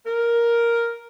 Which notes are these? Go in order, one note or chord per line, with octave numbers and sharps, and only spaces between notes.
A#4